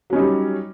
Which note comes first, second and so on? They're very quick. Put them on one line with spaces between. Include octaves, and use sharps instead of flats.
F#3 C#4 D#4 G3